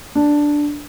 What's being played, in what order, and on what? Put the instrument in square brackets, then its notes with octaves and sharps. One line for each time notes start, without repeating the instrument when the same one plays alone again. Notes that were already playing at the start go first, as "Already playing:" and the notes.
[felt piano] D4